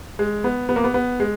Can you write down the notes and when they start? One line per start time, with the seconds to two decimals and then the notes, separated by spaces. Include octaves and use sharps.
0.19 G#3
0.44 B3
0.69 B3
0.76 A#3
0.84 B3
0.94 B3
1.20 G#3